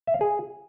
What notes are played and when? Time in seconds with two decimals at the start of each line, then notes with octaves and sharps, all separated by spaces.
0.07 E5
0.14 F5
0.21 G#4